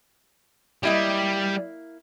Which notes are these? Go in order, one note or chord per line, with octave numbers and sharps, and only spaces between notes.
G3 A#3 E4 D#5